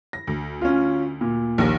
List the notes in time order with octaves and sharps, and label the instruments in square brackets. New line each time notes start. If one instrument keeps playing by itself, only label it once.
[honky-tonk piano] A#6
D2
[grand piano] C#4 F4
A#2
[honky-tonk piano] A#1 D#2 A#6